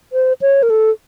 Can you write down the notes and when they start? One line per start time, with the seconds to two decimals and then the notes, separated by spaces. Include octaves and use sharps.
0.13 C5
0.42 C#5
0.63 A#4
0.70 A4